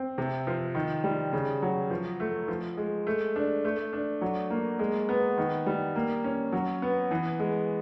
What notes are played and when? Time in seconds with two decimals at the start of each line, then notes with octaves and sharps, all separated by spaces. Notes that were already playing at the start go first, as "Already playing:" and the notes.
Already playing: C4
0.18 C3
0.47 F3
0.75 D#3
1.04 G3
1.33 C#3
1.62 F#3
1.90 F3
2.20 A3
2.48 F3
2.77 G#3
3.07 A3
3.36 D4
3.65 A3
3.93 D4
4.21 F#3
4.50 A#3
4.79 G#3
5.09 B3
5.38 D#3
5.66 G3
5.96 A#3
6.24 C#4
6.52 F#3
6.82 B3
7.11 E3
7.39 G#3